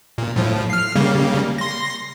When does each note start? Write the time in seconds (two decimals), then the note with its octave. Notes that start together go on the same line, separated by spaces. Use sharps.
0.18 A#2
0.36 A2 F3
0.70 F6 C7
0.96 C#3 G3 A#3
1.58 C6 A#6